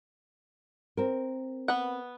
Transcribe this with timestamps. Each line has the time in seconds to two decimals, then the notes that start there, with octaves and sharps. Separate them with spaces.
0.97 C4 A#4
1.68 B3 F#5